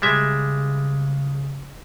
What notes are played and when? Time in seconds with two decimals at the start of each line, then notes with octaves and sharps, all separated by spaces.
0.02 C#3 G3 G#3 E5